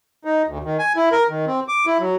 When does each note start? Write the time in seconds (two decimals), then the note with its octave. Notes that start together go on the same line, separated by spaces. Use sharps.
0.25 D#4
0.47 D2
0.65 D#3
0.79 G#5
0.96 E4
1.12 A#4
1.29 D#3
1.47 C4
1.68 D6
1.86 E4
2.00 F#3